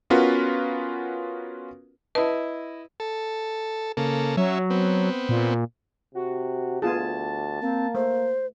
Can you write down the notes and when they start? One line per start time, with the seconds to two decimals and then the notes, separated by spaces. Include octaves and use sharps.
0.10 B3 C#4 F4 F#4 A#4 B4
2.15 E4 B4 D#5 A5
3.00 A4
3.97 C#3 A#3 A4
4.37 F#3 C#4 E5
4.70 B3 C4
5.29 A#2
6.15 C3 F#4
6.82 D2 B3 F4 G#4 A5
7.62 A#3 C4
7.95 A3 C5